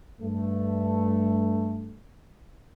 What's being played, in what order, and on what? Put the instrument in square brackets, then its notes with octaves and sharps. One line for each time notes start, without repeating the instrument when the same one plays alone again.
[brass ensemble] G2 A3